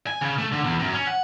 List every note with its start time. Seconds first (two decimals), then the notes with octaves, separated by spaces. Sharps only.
0.07 G#5
0.22 C#3
0.38 A3
0.52 D3
0.64 E2
0.79 F#2
0.93 C#4
1.07 F#5